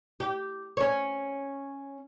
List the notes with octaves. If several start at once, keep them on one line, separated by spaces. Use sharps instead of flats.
G4
C#4 C#5